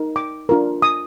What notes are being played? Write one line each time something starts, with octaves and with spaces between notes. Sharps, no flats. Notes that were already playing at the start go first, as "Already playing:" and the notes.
Already playing: D#4 A#4
D6
D4 F4 A#4
D#6